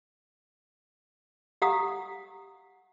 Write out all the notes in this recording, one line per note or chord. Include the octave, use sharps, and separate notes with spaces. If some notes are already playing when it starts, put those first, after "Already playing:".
G4 F5 F#5 A#5 D#6